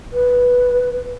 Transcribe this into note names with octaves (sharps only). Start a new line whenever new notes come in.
B4